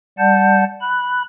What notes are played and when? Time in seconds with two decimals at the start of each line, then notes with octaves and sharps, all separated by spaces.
0.18 G3 D5 F#5 A5 G6
0.81 B5 F#6